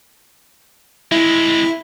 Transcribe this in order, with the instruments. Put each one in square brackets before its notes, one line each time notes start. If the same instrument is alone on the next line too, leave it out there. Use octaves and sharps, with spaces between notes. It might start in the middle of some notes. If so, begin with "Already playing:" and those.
[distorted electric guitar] G#3 C4 [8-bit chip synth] E4